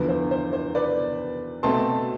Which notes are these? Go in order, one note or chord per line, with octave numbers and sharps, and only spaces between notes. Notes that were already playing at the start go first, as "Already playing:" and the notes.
Already playing: E2 D3 F3 B3 B4
C5
C5
C5
B4 D5
B2 A3 C4 A5 C6